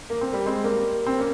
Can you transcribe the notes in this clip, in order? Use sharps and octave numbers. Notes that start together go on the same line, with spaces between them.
A#3
C4
G3 A#3
G#3 C4
G3 A#3
C4
A#3 C#4